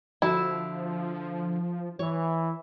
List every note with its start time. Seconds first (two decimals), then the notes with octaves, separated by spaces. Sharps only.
0.22 D3 F3 E4 F#4 A5
1.99 E3 C#5